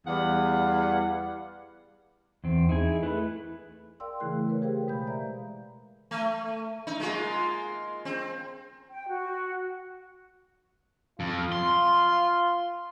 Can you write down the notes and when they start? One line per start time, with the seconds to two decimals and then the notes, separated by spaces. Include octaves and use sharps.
0.07 E2 G3 B4 F5 F#5
2.44 E2 C4
2.69 D#4 E4 G#4
3.03 A3 E4 B4
4.00 A#4 D5 F5 G5 C6 E6
4.20 C#3 E3 A3 E4 G#4 F#6
4.48 A#4 B4 C#5
4.62 G4 G#4 A#4 C5 F5 G5
4.87 B2 G#3 C5 B5 G6
5.07 D5 E5 F5 A#5
6.11 A3
6.87 D#4
7.00 G#3 A#3 F4
8.05 C4
8.90 G5
9.08 F#4
11.20 F2 F4
11.52 C6